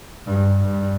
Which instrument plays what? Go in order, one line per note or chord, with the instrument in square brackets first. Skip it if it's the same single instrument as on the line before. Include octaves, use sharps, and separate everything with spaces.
[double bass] G2
G2